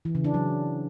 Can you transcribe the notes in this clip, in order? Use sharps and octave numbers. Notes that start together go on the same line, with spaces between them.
E3
C#3
D4
F#3